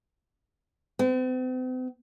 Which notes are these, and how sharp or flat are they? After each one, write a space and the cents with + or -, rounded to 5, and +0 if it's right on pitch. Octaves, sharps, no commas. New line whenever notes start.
C4 -45